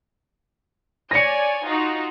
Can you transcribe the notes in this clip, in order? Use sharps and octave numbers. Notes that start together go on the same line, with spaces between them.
C#5 D5 G#5 A#6 C#7
D#4 F4 F#4